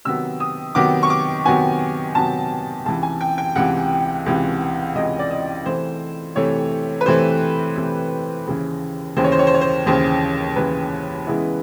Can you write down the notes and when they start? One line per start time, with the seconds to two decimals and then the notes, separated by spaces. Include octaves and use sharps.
0.05 C3 D#3 F#3 B3 E6
0.40 D#6
0.75 C3 D#3 F#3 B3 D6
1.03 C#6
1.10 D6
1.45 C3 D#3 F#3 B3 G#5
2.15 C3 D#3 F#3 B3 A5
2.86 C#2 C3 E3 A5
3.03 G#5
3.21 G5
3.38 G5
3.55 C#2 C3 E3 F#5
4.26 C#2 C3 E3
4.96 C#2 C3 E3 D#5
5.19 D5
5.31 D#5
5.65 C3 E3 A3 C5
6.36 C3 E3 A3 C#5
7.01 B4
7.06 C3 E3 A3 C5
7.76 C3 E3 A3
8.46 D#2 C#3 E3
9.17 D#2 C#3 E3 C5
9.24 C#5
9.32 C5
9.39 C#5
9.47 C5
9.54 C#5
9.61 C5
9.86 D#2 C#3 E3 C5
10.56 D#2 C#3 E3 B4
11.27 C#3 E3 G#3 B3 E4